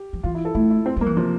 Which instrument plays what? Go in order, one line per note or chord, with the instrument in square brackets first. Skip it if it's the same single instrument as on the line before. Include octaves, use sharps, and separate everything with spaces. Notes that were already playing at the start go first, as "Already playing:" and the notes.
Already playing: [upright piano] G4
[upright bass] F3
[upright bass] E3 [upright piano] F4
[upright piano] E4
A4
[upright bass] A3 [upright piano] E4
[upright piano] E4
C4
[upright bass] G3 [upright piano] A#3
[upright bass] E3
[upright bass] C3 [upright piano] F3